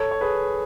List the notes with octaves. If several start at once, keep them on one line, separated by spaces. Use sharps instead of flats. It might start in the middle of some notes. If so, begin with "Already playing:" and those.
Already playing: A4 C#5
C#5
G#4 B4